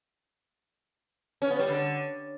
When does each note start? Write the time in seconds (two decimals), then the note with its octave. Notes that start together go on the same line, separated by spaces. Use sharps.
1.42 C#4
1.50 B3
1.59 G3
1.68 D3